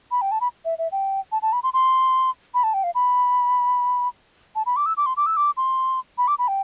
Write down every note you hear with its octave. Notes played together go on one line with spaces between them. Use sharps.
B5
G5
A5
B5
E5
E5
G5
A5
A5
B5
C6
C6
B5
A5
G5
F5
B5
A5
B5
D6
E6
D6
C6
D6
E6
D6
C6
B5
D6
B5
G5